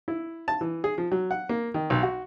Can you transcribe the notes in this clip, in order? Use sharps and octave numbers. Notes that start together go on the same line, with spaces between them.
E4
A5
E3
G#4
F3
F#3
F#5
A#3
D#3
B1
F#4